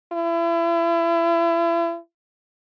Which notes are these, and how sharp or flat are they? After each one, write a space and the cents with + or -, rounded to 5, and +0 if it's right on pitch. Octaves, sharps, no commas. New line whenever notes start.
E4 +35